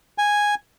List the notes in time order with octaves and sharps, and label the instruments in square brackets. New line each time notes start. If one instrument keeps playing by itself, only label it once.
[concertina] G#5